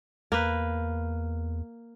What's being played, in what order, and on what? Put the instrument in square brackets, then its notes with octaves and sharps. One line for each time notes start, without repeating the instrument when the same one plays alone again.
[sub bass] E2 [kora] A#3 B4